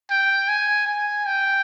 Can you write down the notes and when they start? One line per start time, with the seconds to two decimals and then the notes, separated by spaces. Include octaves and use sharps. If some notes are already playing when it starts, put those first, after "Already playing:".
0.10 G5
0.49 G#5
0.87 G#5
1.26 G5